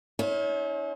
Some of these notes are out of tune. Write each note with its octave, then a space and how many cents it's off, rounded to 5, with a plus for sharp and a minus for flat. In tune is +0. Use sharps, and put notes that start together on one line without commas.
C#4 +30 E4 -45 C#5 -45